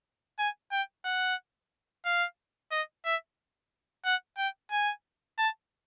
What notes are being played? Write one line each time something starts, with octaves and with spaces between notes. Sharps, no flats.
G#5
G5
F#5
F5
D#5
E5
F#5
G5
G#5
A5